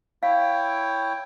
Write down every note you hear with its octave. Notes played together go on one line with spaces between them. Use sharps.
E4 C#5 F5 G5